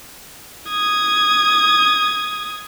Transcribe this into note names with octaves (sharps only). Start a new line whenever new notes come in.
D#6 G#6